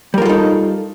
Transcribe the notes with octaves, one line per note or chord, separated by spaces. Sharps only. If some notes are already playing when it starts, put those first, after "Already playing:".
G3 D#4 F4 A4 A#4